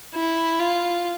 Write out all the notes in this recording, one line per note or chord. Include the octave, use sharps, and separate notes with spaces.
E4
F4